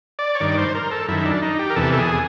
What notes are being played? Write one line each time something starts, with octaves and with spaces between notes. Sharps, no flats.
D5
C#5
G2 D#3 D5
C5
A#4
A4
F#2 D#3 E4
D4
D#4
G4
A#4
E2 C3 E3 A4
A4
G#4